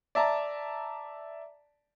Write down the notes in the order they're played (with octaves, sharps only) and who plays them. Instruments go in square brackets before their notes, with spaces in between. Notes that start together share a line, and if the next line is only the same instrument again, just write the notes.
[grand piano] D5 E5 A5 A#5